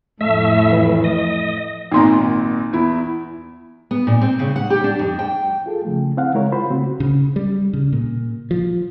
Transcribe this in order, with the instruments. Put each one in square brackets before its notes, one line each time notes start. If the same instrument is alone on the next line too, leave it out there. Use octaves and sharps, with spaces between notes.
[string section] F2 A2 F3 [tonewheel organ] A3 E5
[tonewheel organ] E3
D#5
[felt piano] G#1 A#2 A#5 [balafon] D#4 C6
[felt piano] E2 E4
[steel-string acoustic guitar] B3
A#2
C4
C#3
F#5
G4
D4
F2
G5
[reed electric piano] F4 G#4 A4
C#3 F3 A3
C4 E4 F5 F#5
C#3 G#3 E4 A#4 C#5
F4 C5 B5
C#3 A3 C4 F#4
[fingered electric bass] C#3
G3
C#3
A#2
F3